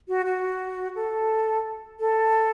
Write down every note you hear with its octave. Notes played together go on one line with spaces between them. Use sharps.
F#4
F#4
A4
A4